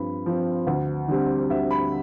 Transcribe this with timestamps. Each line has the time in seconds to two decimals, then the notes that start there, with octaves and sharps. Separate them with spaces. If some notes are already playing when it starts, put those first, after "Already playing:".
Already playing: G2 F3 C4 B5
0.26 F3 C4
0.67 D2
1.08 D3 G3 C4
1.50 D2 E5
1.71 B5